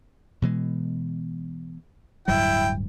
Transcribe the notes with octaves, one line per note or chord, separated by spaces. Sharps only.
B2 E3 G#3
D1 G2 F#3 E4 G5